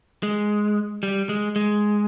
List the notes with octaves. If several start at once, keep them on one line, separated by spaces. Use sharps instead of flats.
G#3
G3
G#3
G#3